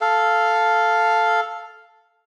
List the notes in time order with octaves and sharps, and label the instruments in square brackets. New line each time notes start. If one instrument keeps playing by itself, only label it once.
[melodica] A4 F5